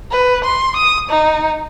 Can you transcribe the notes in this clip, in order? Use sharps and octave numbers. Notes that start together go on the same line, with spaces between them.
B4
C6
D#6
D#4